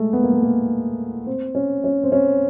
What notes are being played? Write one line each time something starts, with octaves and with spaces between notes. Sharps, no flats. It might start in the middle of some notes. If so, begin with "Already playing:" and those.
Already playing: G#3 A3
B3
A#3
A3
A#3
C4
C#4
C#4
C4
C#4